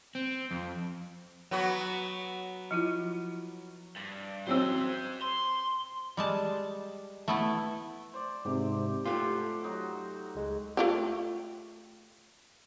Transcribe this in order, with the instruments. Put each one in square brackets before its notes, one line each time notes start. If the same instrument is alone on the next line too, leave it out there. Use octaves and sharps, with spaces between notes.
[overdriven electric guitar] C4
F2
[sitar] F#3 B3 F#4
[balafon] F3 E4 F4
[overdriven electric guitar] G2
[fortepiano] F#3 C4 E6 [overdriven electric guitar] C5 D#5
[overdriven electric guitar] C6
[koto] G3 G#3 A5
A3 B3 E4
[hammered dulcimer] C5 D5
[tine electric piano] G#2 C3 [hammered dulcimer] G4
[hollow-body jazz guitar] A3 F4 [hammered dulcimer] G4 F#5 [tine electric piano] C6
[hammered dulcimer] F#3 D#4 F#4
[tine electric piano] C#2 G#3
[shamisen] A3 F4 G4